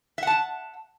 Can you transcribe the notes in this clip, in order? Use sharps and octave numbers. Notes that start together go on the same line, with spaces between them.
E5 F#5 A5